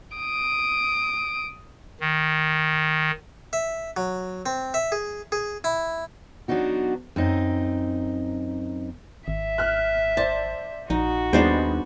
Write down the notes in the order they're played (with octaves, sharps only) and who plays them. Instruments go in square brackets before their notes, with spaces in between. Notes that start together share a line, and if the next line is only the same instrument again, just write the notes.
[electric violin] D#6 D7
[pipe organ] D#3
[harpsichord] E5
F#3
C4
E5
G#4
G#4
E4
[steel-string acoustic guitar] F#3 B3 D4 D#4 F#4
F#2 C4 D#4
[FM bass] G#1 [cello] E5
[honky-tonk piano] F6 F#6
[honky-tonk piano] C5 D5 [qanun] A5
[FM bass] A#1 [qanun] D#4 [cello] F#4
[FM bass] D#2 [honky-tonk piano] G3 D#4 G#4 [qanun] B3 D4 C5